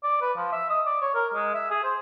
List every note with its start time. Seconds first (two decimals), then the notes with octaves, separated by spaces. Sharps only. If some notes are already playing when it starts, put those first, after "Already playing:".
0.03 D5
0.21 B4
0.36 F3
0.52 E5
0.69 D#5
0.86 D5
1.02 C#5
1.14 A#4
1.34 G#3
1.54 E5
1.71 G#4
1.84 C5